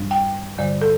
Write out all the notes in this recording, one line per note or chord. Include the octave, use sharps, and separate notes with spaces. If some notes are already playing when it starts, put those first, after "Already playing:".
Already playing: G2 G3 D4
G5
G2 D3 G3 D5
A4